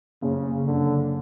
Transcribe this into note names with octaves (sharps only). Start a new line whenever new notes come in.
F#1 C#3
F#2 D3